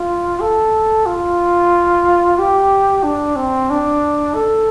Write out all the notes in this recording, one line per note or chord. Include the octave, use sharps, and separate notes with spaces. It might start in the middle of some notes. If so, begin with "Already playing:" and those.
Already playing: F4
A4
F4
G4
D4
C4
D4
A4